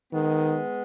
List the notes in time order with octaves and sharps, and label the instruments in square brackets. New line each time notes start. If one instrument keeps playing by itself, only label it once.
[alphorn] D#3 [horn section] G#3 B3